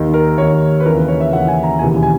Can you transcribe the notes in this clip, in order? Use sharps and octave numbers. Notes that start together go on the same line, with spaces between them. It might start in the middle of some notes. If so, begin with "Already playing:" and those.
Already playing: D#2 D#3
A#4
D#2 D#3 C#5
B4
D#2 C#3 E3 A#4
B4
C#5
E5
D#2 C#3 E3 F#5
G#5
A#5
E1 D#2 C#3 E3 G#5
G#5